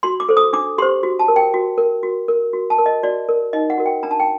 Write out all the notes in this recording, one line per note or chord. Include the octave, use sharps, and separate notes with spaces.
F#4 C6
D6
A4 C5
D#6
D4 D6
G4 C5 C6
F#4
A5
A#4
G5
F#4
A#4
F#4
A#4
F#4
A5
A#4
D#5
F#4 D5
A#4
D#4 D#5
F#5
F#4 A#4
G5
D4 A#5
A5
G5